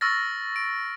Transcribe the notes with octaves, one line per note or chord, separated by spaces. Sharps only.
C#6 E6 F6 A6 A#6
D7